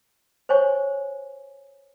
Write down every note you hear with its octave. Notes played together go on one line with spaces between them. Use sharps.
C5 C#5 G#5 C#6